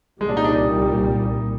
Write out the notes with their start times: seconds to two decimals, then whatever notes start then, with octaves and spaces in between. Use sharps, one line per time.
0.21 C2 A#2 G3 G#3
0.29 D4
0.37 D#4
0.44 D4
0.52 D#4